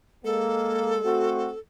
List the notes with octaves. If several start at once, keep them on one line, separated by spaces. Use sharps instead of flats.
G#3 A#3 A4
A3 C4 F#4